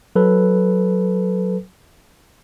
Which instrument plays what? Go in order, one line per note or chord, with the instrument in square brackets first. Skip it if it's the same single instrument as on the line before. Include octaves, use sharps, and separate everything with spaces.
[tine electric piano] F#3 A4 B4